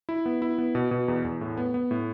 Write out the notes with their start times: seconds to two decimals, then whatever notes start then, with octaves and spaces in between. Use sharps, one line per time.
0.09 E4
0.26 B3
0.42 E4
0.58 B3
0.75 B2
0.91 B2
1.08 E2
1.25 E2
1.41 A2
1.57 B3
1.74 B3
1.91 A2